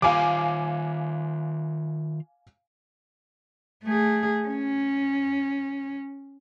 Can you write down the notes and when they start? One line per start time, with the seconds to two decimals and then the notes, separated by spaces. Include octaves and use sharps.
0.02 D#3 F4 F5 G#5 D6
3.84 A3 G#4
4.48 C#4